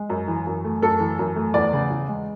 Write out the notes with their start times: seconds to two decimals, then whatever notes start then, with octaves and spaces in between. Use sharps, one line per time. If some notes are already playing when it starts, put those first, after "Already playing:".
Already playing: G#3
0.10 F#2
0.28 E3
0.47 F#2
0.64 A3
0.82 F#2 A4
1.00 E3
1.19 F#2
1.36 A3
1.54 E2 D5
1.73 C#3
1.90 E2
2.09 G#3